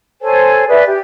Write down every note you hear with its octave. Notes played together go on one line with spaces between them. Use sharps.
A4 C5 C#5 G#5
G#4 B4 D5 E5
G4